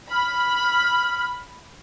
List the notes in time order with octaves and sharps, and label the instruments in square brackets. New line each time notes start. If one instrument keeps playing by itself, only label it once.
[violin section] B5 [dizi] F6